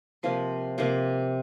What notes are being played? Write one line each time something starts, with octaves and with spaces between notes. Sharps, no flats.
C3 F3 A#3
C3 F3 A#3